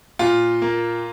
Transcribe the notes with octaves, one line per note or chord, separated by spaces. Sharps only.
A#2 F4
A#3